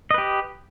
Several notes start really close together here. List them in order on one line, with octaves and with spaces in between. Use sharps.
D#5 B4 G4